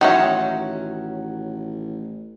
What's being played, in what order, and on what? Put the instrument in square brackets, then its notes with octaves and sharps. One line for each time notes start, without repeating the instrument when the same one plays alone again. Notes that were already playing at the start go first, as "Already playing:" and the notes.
[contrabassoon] A1 [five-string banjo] D#3 F#3 C#4 [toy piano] F#4 C#5 E5 [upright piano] F#5